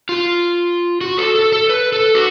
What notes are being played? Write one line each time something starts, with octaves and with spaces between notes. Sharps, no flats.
F4
F#4
A4
A4
A4
B4
A4
F#4